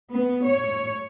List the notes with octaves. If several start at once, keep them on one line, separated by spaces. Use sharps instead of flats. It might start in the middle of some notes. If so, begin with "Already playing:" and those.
B3
C#5